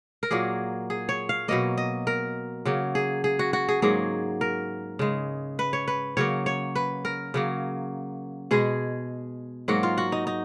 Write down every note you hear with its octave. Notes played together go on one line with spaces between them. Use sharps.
A#4
A#2 F#3 A#3 G#4
G#4
C#5
F5
B2 F#3 A#3 D#5
D#5
A#4
C#3 F#3 A#3
G#4
G#4
F#4
F#4
G#4
G#2 F#3 A#3 G#4
A#4
C#3 G#3
B4
C#5
B4
C#3 F#3 A#3 C#5
C#5
B4
A#4
C#3 F#3 A#3
B2 G#3 G#4
G#2 F#3 A#3 F#4
F4
F#4
D#4
D#4